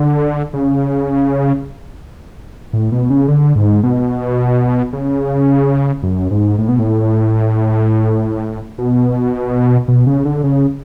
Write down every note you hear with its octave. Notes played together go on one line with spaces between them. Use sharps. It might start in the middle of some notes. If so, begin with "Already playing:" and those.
Already playing: D3
C#3
A2
B2
C#3
D3
G#2
B2
C#3
F#2
G#2
A2
B2
A2
B2
B2
C#3
D3
C#3